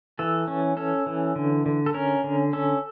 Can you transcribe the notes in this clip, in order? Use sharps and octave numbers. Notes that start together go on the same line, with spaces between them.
E3 A4
C#4
C#4 A4
E3
D3
D3
A4
C#4 A#4
D3
C#4 A4